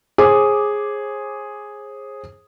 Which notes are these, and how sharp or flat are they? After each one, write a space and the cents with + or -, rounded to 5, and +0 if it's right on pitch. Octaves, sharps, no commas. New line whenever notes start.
G#4 +0 C5 +40 D6 +0